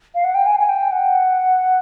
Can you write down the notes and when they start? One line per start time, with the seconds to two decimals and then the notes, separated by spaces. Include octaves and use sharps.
0.15 F5
0.24 F#5
0.34 G5
0.46 G#5
0.60 G#5
0.69 G5
0.92 F#5